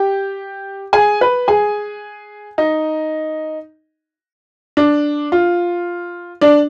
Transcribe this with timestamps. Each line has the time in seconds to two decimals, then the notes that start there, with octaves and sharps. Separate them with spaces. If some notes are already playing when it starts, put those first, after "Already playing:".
Already playing: G4 G5
0.93 G#4 G#5
1.21 B4 B5
1.48 G#4 G#5
2.58 D#4 D#5
4.77 D4 D5
5.32 F4
6.41 D4 D5